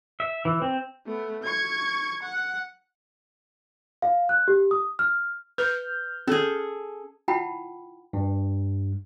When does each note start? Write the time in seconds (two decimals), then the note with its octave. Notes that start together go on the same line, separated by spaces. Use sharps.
0.20 E5
0.45 E3
0.62 C4
1.06 A3 B3
1.43 C#6 G#6
2.23 F#5
4.02 F5
4.29 F#6
4.48 G4
4.71 D#6
4.99 F6
5.58 B4 F6 G6
6.28 C#4 G#4 A4
7.28 E4 F4 F#5 G5 A5 B5
8.13 G2